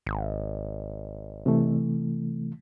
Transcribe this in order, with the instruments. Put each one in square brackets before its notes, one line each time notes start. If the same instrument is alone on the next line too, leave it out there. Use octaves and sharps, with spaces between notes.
[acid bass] G#1
[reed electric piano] C3 E3 A3